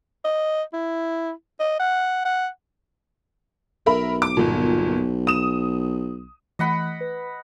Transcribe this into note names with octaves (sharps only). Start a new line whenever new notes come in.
D#5
E4
D#5
F#5
F#5
B1 A#4 E5 B5
D6
G1 A#2
D#6 E7
E3 A3 D#5 F#5 B5
B4